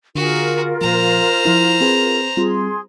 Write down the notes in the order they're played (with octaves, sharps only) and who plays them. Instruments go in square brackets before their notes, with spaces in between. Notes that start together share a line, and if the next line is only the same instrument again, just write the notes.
[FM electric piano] D3 [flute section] F4 A#4 [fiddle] F#4 G#4
[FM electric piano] A#2 F3 [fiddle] C5 A#5
[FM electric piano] F3 E4
C4 G#4 B4
[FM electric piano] G3 C4 F4 [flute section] G#4 C6